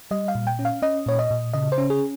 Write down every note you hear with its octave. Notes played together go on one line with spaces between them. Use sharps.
G3 D#5
F5
A#2
G5
C#4
F5
C#4 D#5
A#2 C#5
D#5
A#2
C#3 D#5
C5
C#4
G#4